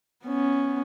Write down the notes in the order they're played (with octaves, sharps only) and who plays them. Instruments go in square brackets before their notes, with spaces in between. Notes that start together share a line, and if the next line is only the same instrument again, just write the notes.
[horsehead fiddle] B3 C#4